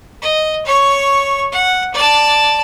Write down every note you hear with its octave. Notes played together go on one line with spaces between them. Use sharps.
D#5
C#5 C#6
F#5
D5 A5